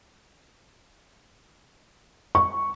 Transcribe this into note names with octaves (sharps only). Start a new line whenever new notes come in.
C#6